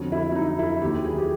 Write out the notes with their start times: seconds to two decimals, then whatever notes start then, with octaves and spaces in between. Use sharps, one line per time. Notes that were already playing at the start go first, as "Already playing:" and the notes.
Already playing: F2 D3 F#3
0.12 E4
0.32 E4
0.35 D#4
0.59 E4
0.82 D#2 D#3 F#3 G4
1.05 G#4
1.18 G4